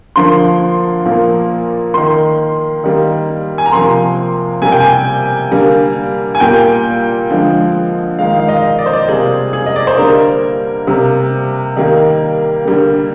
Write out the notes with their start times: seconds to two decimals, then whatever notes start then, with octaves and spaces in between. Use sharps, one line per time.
0.16 D3 F3 A#3 C6
1.06 A#2 F3 A#3
1.94 D#3 A#3 C6
2.84 D#3 G3 A#3
3.58 G#5
3.66 A#5
3.72 C3 F3 A#3 C6
4.62 C3 G3 A#3 G#5
4.72 G5
4.80 G#5
5.51 D3 G3 A#3
6.35 G#5
6.40 A#2 G3 A#3 G5
7.30 D3 F3 G#3
8.19 D#3 G#3 F5
8.40 F5
8.48 D#5
8.79 D5
8.86 C5
8.93 D5
9.08 C3 G3 A#3 G#4
9.53 G#4
9.66 D#5
9.76 D5
9.87 C5
9.98 D3 G3 A#3 A#4
10.87 C3 G3 A#3
11.76 D#3 G3 A#3
12.65 D3 G3 A#3